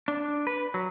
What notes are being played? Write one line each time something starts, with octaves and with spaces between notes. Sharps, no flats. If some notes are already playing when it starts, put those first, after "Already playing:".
D4
B4
F#3